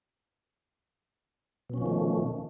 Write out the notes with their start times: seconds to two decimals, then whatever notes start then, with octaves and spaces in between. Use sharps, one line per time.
1.70 B2
1.74 C#4
1.78 F3
1.82 D#3
1.86 A3